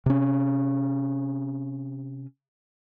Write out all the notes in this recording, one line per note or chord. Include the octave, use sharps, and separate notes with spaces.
C3 C#4